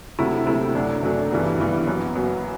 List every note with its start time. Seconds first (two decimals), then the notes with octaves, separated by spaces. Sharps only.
0.19 D2 C3 F#3 A3 E4
0.46 D2 C3 F#3 A3 E4
0.74 F#2 F#3 A3 D4
1.02 F#2 F#3 A3 D4
1.31 G2 E3 G3 B3
1.59 G2 E3 G3 B3
1.87 F#2 F#3 B3
2.15 F#2 F#3 B3